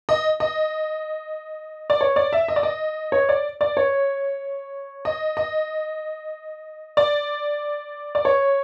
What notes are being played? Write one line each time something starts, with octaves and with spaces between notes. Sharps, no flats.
D#5
D#5
D5
C#5
D5
E5
D#5
D5
D#5
C#5
D5
D5
C#5
D#5
D#5
D5
D5
C#5